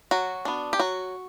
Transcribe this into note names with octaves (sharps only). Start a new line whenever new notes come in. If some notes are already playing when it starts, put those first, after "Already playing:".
F#3 F#4
B3 D4
G4
F#3 F#4